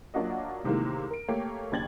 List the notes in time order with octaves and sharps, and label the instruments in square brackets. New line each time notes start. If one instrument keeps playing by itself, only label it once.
[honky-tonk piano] F#3 A#3 D4 F4 F#4 D#5
A2 C3 D#3 E3 G#3 A#3
A#4 D7
A3 A#3 G4 C#5
F#1 D#2 D4 G#6 A6 F#7